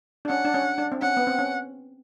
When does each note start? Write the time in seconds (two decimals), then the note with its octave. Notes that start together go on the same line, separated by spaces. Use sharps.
0.25 D4
0.29 C#4 F#5
0.45 D4
0.54 C#4
0.78 D4
0.92 C4
1.02 C#4 F#5
1.17 B3
1.27 C4
1.39 C#4